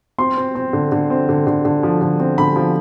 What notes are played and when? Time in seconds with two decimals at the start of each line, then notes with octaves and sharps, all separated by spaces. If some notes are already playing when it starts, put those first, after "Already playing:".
0.18 C4 C6
0.37 C4
0.55 C4
0.73 D3
0.92 D3
1.10 C4
1.29 D3
1.47 D3
1.65 D3
1.83 F3
2.01 D3
2.20 C4
2.38 D3 B5
2.56 F3